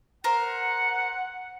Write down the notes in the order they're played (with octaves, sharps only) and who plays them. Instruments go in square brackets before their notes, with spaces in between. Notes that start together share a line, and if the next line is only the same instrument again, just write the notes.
[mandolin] A#4 C5 [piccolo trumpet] F#5